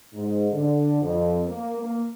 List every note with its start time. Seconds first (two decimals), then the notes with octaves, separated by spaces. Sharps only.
0.13 G#2
0.51 D3
1.00 F2
1.46 A#3
1.78 A#3